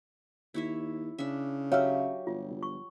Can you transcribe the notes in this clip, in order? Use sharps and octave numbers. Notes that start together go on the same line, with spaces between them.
D#2 E4 C#5 E5
C#3 D4 E5
F#3 G4 C#5 E5 F5
G1 F4
C#6